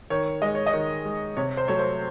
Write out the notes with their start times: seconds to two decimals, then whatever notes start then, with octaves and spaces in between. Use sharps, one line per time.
0.10 D#3 C#5
0.42 G#3 D#5
0.55 C#5
0.67 D#5
0.74 D#3
1.05 G#3
1.37 C3 C#5
1.57 C5
1.68 F#3 A3 C#5
1.79 C5